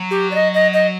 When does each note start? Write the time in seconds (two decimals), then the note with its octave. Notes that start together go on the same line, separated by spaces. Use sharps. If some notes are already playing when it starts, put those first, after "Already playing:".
Already playing: F#3
0.11 G4
0.31 D5
0.35 D#5
0.54 D#5
0.73 D#5